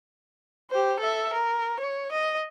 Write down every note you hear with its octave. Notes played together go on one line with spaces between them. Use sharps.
G4 C5
A4 E5
A#4
C#5
D#5